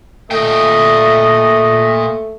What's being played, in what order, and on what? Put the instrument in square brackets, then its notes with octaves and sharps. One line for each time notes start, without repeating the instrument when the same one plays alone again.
[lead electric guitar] A#2 G5 [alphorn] A3 [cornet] D#5